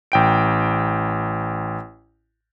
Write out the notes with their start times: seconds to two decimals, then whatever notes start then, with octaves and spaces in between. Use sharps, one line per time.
0.12 A1 G5 D7